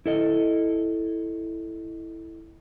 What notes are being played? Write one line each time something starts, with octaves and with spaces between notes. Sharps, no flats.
E4 A4 D#5